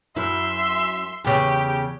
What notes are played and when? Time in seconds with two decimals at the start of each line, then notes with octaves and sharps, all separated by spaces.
0.16 F#2 E4 E5 C6
1.24 E2 C#3 G4